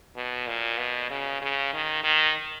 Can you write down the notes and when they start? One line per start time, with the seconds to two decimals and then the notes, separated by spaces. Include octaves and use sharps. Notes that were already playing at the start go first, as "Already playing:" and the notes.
0.16 B2
0.47 A#2
0.78 B2
1.10 C#3
1.42 C#3
1.73 D#3
2.04 D#3